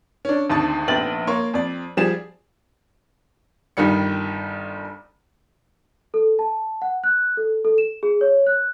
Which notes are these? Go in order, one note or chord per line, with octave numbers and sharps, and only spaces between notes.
C#4 D4
G#1 D2 G#2 A5 D#6
F1 A#1 B3 G5 A6 F#7
A#3 C#5 C6 C#6
F2 D5
F3 G3 G#4 E7
G1 D#3 G3 C#7
A4
A5
F#5
F#6
A4
A4
E7
G#4
C#5
F#6